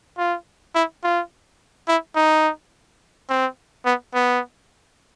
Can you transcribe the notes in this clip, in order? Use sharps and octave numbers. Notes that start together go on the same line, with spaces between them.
F4
E4
F4
E4
D#4
C4
B3
B3